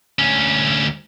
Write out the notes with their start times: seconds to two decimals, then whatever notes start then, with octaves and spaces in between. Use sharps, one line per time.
0.19 D2 C#4